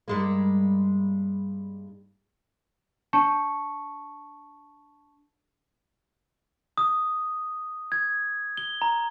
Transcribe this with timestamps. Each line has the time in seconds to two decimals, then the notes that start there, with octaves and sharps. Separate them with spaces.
0.08 G2 G#3 A#3
3.13 D4 A5 C#6 C#7
6.78 D#6
7.92 G#6
8.57 G7
8.82 A#5